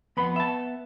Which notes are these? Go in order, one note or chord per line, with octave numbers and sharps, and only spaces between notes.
F2 B3 B4 F#5 B5 C6
E5 A5